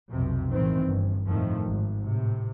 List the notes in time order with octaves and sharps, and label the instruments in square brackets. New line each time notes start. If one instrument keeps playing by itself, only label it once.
[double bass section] B1 F2 C3
A1 D#3 E3 C4
G1
F2 A2 D#3 F3 A3
G#1
A2 C3